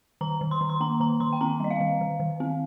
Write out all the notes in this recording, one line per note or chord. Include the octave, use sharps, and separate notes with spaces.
D#3 A#5
D#3
C6
D#3
C6
A#3 A#5
D#3 A#5
D#3 C6
G5
C4 A#5
G3 D#5
F5
D#3
D#3
D#3
C4